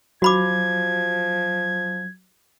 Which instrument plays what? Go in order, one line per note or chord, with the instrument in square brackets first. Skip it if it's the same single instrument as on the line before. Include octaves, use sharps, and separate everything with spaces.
[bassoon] F3 [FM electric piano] F#3 [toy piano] F#4 B5 D6 [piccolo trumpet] G#6